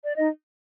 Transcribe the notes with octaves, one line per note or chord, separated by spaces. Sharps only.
D5
D#4 D#5